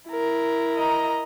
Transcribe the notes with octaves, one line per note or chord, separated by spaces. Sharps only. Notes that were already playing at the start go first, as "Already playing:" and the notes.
E4 A#4
D#5 A#5